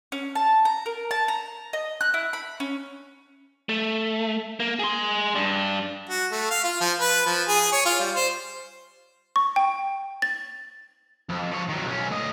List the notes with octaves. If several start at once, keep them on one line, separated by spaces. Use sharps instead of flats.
C#4
A5
A#5
A#4
A5
A#5
D#5
F#6
E4
B5
C#4
A3
A#3
G#4 C6
G2 D4
F#4
A3
F5
F4
F3
B4
F3
G#4
C#5
F4
G3
C5
C#6
G5
A6
F2
F3 C#5
D#3 F#3
B1 C#4
D2 D#5